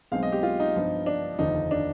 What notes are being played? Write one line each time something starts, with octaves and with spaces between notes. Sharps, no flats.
B1 B2 G#3 C4 F5
D#5
G4
F4
D#4
G2 F3 B3
D4
F1 D#2 D3 F3 D#4
D4